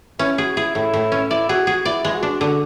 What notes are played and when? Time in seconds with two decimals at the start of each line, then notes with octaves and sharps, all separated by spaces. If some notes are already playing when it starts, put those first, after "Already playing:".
0.19 C#4 E4
0.38 F#4 G#4
0.56 E4 G#4
0.75 A2 E4
0.94 A2
1.12 C#4
1.30 E4 D5
1.49 F#4 G#4
1.67 F#4 G#4
1.85 E4 D5
2.05 G#3
2.14 F#4
2.23 D4
2.41 D3 F#4